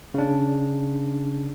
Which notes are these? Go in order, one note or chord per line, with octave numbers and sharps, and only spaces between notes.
C#3 D4